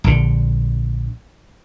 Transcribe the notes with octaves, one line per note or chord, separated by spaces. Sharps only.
A#1 D3